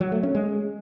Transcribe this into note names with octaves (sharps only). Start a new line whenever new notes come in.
F#3
A3
C#4
G#3